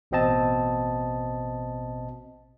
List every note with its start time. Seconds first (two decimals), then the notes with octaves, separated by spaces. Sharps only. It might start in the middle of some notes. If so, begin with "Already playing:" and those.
0.11 A1 B2 C4 D#5 A5